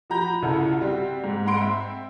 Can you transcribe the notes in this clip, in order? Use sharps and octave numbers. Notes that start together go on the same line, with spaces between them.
F3 F#4 G4 A#5 B5 G6
C2 C#3 E4 F4 A4 F#5
G3 C4 F#4
G#2
G#2 F#5 B5 C6 D7
C4 E5